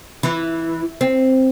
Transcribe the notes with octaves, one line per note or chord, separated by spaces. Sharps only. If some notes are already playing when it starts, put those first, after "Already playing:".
E3
C4